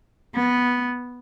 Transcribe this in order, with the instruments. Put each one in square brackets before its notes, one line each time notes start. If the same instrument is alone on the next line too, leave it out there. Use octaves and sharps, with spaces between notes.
[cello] B3